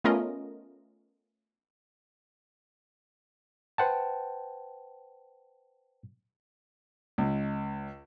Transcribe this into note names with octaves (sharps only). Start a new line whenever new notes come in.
A3 B3 C#4 F4 A#4 D#5
B4 C5 F#5 G5 A5
C#2